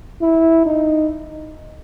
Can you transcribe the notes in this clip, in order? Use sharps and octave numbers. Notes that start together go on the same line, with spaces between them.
E4
D#4